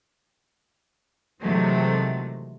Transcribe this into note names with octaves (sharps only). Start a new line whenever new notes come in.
C3 D#3 E3 F#3 G#3 A3